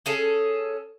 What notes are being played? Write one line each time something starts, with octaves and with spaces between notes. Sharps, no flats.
C#4 G#4 A4